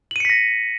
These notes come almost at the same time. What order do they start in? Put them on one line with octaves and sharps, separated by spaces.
F#7 D#7 C#7 B6 A#6